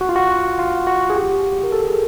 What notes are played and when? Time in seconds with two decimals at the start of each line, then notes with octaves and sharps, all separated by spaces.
0.01 F#4
0.09 F4
0.16 F#4
0.59 F4
0.87 F#4
1.10 G#4
1.16 G4
1.63 A#4
1.72 A4
1.87 G#4